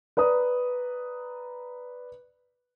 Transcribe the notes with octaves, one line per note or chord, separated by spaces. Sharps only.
B4 D5 A#5 D#6